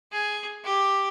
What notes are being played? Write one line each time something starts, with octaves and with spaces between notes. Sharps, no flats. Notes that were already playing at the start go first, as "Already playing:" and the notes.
G#4
G4